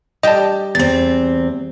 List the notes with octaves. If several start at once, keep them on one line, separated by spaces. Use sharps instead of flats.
G3 G4 D#5 A5
E2 C4 A6